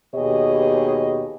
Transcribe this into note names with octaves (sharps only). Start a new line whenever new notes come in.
D#2 B2 G4 G#4 C#5 D#5